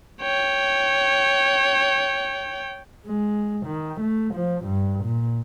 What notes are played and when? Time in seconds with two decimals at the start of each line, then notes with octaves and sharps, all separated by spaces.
0.22 C#5 G5
3.06 G#3
3.66 D#3
4.01 A3
4.34 F3
4.64 G2
5.04 A#2